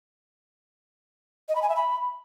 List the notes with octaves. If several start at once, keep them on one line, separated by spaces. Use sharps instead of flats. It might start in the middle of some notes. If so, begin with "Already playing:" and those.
D#5
B5
G#5
E5
B5